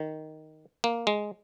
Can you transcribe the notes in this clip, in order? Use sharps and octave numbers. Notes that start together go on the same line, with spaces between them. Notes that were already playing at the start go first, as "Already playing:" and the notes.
Already playing: D#3
A#3
G#3